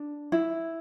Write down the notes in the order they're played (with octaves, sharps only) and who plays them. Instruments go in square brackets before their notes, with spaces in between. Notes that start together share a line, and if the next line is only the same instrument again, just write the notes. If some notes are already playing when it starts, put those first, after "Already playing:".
Already playing: [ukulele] D4
E4